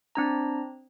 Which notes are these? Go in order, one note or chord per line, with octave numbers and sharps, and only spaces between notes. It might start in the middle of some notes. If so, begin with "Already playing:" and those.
C4 D4 A#5